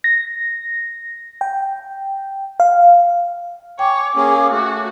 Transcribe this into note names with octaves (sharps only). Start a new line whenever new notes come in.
A#6
G5
F5
C#5 G5 G#5 D6
A#3 C#4 G#4
A3 F#4